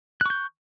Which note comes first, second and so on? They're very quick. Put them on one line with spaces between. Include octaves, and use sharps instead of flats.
F#6 C#6 G6